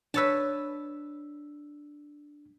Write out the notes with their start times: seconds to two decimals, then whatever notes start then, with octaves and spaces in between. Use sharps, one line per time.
0.14 D4 B4 C#5 A5 E6